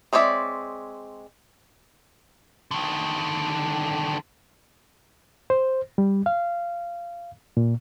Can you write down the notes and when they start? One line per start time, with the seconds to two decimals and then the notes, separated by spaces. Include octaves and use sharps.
0.13 G#3 C4 C#5 D5 E5
2.71 D3 D#3
5.50 C5
5.98 G3
6.26 F5
7.57 A#2